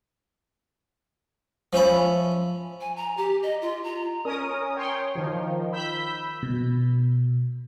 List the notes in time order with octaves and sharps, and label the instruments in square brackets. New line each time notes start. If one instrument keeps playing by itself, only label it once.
[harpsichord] F3 C#4 E5 B5
[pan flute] G#5
A#5
G4
D#5
F4
A#5
[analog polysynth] C#4 A#4 D#6
C#5 G5 C6
D#3 F3
B5 E6 G6 B6
[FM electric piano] B2